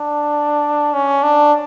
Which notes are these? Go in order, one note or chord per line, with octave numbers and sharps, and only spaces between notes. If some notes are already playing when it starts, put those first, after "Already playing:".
Already playing: D4
C#4
D4